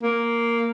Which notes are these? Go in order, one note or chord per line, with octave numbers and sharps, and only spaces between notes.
A#3